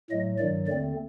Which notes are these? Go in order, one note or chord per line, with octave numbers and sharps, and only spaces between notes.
A2 F#3 A3 D#5
G2 D#3 F#3 D5
D#2 D3 A3 C4 D5